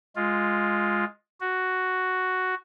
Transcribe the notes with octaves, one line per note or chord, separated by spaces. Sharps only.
G#3 F4
F#4